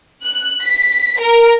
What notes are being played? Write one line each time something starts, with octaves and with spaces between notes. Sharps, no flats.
F#6
B6
A#4